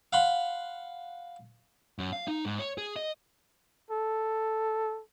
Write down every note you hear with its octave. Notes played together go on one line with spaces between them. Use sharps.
F5 F#5 B5 C6
F#2
F5
D#4
G#2
C#5
G#4
D#5
A4